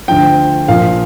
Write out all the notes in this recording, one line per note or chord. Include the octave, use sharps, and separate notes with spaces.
D2 D3 F3 G5
A#1 A#2 F3 F5